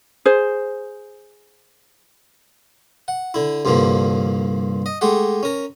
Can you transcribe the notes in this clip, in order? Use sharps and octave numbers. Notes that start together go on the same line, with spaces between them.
G#4 C5
F#5
D3 E4
C2 G2 D3 F3 A#3
D#5
G#3 A3 G4 F#5
C#4 A#4